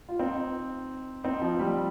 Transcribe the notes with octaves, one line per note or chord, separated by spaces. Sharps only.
F4
C4 D#4
C4 D#4
F3
G3